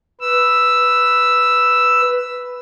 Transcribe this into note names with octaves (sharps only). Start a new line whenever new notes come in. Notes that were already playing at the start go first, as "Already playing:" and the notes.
B4 E6